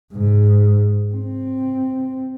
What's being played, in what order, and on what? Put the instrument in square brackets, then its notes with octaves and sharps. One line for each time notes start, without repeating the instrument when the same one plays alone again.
[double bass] G#2
C4